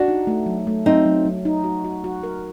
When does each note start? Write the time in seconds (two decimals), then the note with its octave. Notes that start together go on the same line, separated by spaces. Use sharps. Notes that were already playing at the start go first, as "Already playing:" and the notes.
Already playing: D4 F#4
0.08 D#4
0.27 A3
0.46 F#3
0.67 A3
0.86 F#3 C4 D#4
1.06 F#3
1.25 F#3
1.45 D#4
1.64 F#4
1.84 F#4
2.04 F#4
2.23 A#4